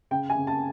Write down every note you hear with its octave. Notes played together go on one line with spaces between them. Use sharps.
C#3 G5
G#5
C#3
A5